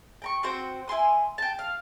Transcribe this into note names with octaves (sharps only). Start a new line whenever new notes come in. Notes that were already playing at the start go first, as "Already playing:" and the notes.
G5 A#5 C#6
C4 F#4 C5 G5
E4 G#5 C6 D#6
G5 A5
F5